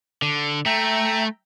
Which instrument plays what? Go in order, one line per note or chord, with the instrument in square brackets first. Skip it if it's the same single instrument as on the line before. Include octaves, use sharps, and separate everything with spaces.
[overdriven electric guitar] D3
[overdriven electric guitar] A3 [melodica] E5 G5 A#5